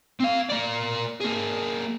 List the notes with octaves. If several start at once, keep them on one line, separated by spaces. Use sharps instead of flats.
C4 F5
A#3 D5
A#3 G#4